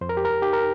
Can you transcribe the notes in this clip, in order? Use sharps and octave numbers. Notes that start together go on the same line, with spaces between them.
F2 C5
A#4
G4
A#4
D#4 G4
A#4